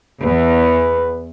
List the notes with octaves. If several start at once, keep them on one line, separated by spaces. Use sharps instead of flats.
E2 B4